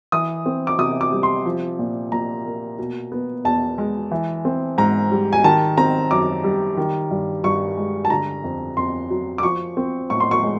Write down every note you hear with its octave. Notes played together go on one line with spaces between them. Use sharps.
E3 D#6
C4
D6
C3 D#6
D6
G3
C6
F3
A#2
A#2 A#5
A#3
B2
B3
E2 A5
G#3
E3
C4
G#2 A#5
G3
G#5
D#3 A5
C4 A#5
F#2 D6
G3
D#3
G2
G2 C#6
G#3
A5
D3 A#5
F2
F2 C6
F#3
D6
F3 C#6
C4
A2 C#6
C6
C#6
G#3